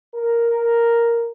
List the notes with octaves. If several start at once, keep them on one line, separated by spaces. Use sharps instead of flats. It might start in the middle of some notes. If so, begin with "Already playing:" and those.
A#4